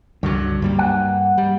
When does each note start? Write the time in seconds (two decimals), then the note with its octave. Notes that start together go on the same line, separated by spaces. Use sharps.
0.23 C#2 G2 D3 F#3
0.62 G2 G3 A#3
0.79 F#5
1.38 G3